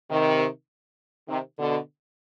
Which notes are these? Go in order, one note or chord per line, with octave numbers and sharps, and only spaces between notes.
C3 D#3
C3 D#3
B2 D3